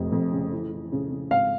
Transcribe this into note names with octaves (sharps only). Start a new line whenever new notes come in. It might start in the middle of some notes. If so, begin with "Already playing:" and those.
Already playing: F1 F2
F2
C#3
E3
E3
C#3
C#3
G#1 F5